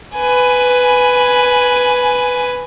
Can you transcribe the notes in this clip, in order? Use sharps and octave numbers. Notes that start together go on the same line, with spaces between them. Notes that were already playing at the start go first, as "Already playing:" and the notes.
B4 G#5